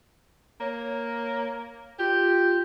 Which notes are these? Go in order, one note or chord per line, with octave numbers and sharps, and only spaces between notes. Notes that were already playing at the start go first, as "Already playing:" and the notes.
A#3 C#5
F4 G4